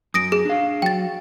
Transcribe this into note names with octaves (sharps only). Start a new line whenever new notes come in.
F#2 D#6 A#6 D7
G#4
D4 F5
F#3 G5 A6